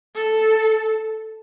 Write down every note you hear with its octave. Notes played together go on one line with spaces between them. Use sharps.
A4